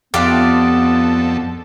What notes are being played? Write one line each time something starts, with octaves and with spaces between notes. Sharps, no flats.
F2 B3 D4 F4 G4 A4 D5